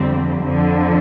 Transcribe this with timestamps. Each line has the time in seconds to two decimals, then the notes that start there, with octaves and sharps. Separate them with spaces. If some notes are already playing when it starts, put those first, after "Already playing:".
Already playing: G1 F2 D3 G3 C4
0.44 F2 D3 F3